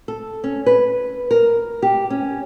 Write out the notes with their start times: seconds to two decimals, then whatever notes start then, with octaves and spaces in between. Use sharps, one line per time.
0.08 A4
0.44 C#4
0.66 B4
1.31 A#4
1.82 G4
2.10 C#4